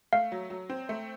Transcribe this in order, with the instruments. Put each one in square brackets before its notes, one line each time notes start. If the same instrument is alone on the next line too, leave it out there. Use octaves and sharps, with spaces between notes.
[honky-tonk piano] A3 [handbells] F5
[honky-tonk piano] F#3
F#3
C4
A3